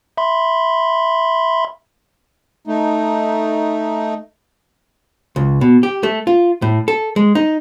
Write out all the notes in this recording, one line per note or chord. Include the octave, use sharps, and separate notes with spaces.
E5 B5 C6
A3 D#4
C#2
B2
G4
A3
F4
A2
A4
G#3
D#4